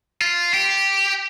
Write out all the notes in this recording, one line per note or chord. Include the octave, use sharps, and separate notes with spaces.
F4
G4